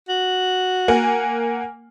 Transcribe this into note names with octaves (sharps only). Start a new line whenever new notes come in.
F#4
A#3 F#5 G#5